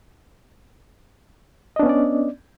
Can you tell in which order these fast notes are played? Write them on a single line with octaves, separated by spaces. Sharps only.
D#5 D4 B3 C#4 D5